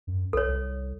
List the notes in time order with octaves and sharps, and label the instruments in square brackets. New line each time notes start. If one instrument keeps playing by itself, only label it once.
[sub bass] F#2
[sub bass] B1 [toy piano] A4 C#5
[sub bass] C2